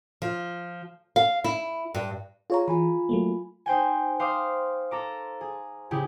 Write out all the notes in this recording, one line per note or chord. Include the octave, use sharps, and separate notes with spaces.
F3
F5
E4
G2
F4 G#4 C#5 A#5
E3 F4 G#5 B5
F#3 A3 A#3
D#4 C5 G5 G#5
C5 F5 C6 D6 D#6
A4 A#5 D6
G#4
C#3 E4 G4 G#4